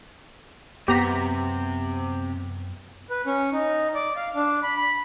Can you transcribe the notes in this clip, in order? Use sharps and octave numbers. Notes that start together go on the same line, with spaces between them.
F#2 C3 B3 G4 A#5 B6
B4
C#4
D#4
D5
F5
D4
B5
B5